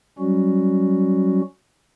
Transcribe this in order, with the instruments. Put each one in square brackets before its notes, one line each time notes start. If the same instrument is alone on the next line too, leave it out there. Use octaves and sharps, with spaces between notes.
[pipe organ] F#3 G3 C#4 F#4